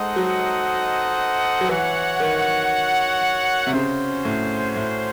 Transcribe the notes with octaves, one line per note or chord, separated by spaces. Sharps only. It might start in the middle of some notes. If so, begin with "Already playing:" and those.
Already playing: G#3 D#4 A4 C5 D#5 F#5
F#3
F#3
E3 F#4 C#5 F#5
D#3
C3
C#3 C#4 F#4 C5
A2
A2